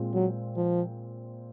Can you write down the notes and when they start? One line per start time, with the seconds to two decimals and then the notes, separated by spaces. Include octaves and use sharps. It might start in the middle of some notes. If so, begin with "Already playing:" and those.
Already playing: A#2 G#3 C4 F4
0.13 F#3
0.56 F3